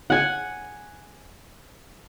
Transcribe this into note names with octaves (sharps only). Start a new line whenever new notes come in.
F#5 G#5